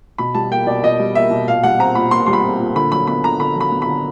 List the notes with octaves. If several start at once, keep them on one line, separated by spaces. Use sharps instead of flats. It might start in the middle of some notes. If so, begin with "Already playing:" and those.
B2 B5
G3 A5
A#3 G5
B2 D5
B2 D#5
G3
A#3 E5
B2
A#2 F5
G3 F#5
C4 A#5
A#2 B5
A#2 C6
G3 C6
B5
C4
A#2
D3 B5
F#3 B5
B3 B5
D3 A#5
D3 B5
F#3 B5
B3
B5
D3